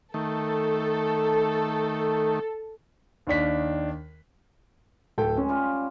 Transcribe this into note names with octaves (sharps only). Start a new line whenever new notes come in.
D#3 A3 A4
D#2 D#3 D4 B6
D1 A4 G5
G#3 C#4
G3 F4